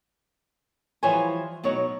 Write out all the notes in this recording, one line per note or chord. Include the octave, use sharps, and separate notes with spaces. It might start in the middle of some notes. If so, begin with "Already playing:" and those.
E3 F3 G3 C5 C#5 G#5
B2 F#3 D#4 C#5